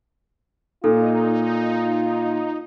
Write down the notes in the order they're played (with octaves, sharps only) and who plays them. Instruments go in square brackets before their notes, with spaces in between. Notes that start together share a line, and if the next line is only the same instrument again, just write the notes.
[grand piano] A#2 [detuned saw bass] D#4 [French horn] F4 [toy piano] A4